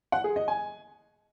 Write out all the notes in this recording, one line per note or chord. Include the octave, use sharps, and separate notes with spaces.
F#5
G#4
D#5
G#5